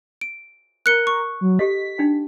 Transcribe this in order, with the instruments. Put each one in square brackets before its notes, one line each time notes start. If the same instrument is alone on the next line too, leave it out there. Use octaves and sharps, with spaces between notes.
[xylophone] D7
[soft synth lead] A#4 [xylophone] F#6 C#7 G7
[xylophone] C#6
[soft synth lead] F#3
[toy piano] G4 A4 D#5 [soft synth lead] B6
[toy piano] D4 D#4 G5